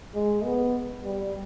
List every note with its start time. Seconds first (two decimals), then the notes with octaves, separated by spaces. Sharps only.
0.15 G#3
0.44 B3
1.04 G3